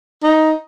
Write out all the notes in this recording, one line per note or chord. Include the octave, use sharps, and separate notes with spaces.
D#4